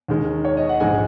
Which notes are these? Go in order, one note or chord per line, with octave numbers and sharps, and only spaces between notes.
D#2 D#3 G#3
C#5
D#5
F#5
A#1 G#2 G#3 G#5